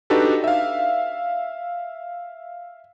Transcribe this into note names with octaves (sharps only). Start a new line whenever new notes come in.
D4 D#4 F#4 G4 A4 B4
E5 F5